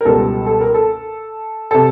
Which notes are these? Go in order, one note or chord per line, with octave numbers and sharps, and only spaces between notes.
A#4
C#2 B2 G3 A4
A4
A#4
A4
C3 A4